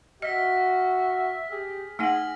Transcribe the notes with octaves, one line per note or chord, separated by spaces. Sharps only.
F#4 D#5 E5 F6 A#6 B6
G4 G#4
A3 D#4 F#5 G#5 F6 A#6 F#7